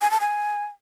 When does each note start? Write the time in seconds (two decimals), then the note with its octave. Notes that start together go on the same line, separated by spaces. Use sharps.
0.01 G#5
0.11 A5
0.20 G#5